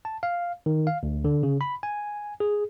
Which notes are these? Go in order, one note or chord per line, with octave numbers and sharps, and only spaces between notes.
A5
F5
D#3
F5
D2
D3
C#3
B5
G#5
G#4